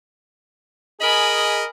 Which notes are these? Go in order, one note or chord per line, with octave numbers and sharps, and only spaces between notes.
G#4 A#4 D#5 G#5 B5